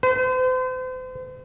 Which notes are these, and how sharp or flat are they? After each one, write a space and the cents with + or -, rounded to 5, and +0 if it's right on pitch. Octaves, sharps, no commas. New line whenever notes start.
C5 -40